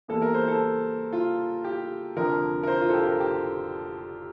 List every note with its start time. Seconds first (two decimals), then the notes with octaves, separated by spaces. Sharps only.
0.08 E2 E3 G3 A#3 A4
0.22 A#4
0.34 C5
0.48 A4
1.13 F4
1.64 G4
2.16 F1 F2 D3 F3 A#4
2.63 A#4
2.67 C5
2.81 F4
2.89 A4
2.94 G4
3.06 A#4
3.20 G4